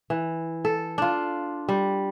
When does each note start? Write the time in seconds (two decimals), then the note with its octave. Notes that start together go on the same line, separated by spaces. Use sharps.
0.10 E3
0.65 A4
0.98 D4 F4
1.69 G3